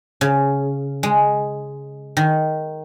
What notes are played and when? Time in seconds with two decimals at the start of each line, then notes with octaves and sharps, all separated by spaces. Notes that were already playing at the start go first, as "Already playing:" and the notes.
0.21 C#3
1.03 G#3
2.17 D#3